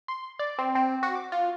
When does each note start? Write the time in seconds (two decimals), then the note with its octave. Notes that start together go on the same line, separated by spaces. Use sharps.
0.08 C6
0.39 D5
0.59 C4
0.75 C4
1.03 F#4
1.15 D6
1.32 F4